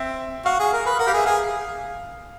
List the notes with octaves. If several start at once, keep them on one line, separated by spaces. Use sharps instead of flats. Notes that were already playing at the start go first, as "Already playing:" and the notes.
Already playing: C4 E5
F#4 F5
G#4
A#4
B4
A#4 F#5
G4 F5
G#4 E5
G#4 F5